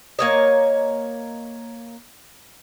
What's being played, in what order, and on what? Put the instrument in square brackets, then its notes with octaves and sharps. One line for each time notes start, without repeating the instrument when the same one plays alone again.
[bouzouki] A#3 C#5 D#5